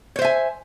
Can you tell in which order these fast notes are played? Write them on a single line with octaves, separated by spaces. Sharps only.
C#5 C5 E5 G#5